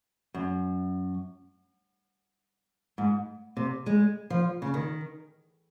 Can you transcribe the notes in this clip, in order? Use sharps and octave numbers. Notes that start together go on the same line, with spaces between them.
F#2
G#2
C3
G#3
F3
C#3
D#3